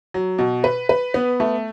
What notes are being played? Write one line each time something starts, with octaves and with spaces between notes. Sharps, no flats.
F#3
B2
B4
B4
B3
A3